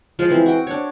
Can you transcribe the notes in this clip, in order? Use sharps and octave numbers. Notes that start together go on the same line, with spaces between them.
F3 G#3 F4 C5
E3 C4
F#4 G5
D4 C#5